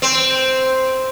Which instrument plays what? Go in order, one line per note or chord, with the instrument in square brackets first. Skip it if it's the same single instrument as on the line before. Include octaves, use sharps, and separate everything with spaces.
[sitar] C4